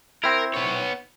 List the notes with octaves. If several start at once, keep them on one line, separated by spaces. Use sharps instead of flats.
C4 E4 A#4
B3 C#5